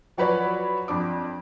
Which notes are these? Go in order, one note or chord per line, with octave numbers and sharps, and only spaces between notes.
F3 F#3 F#4 B4 C#5 D5
F2 D4 D6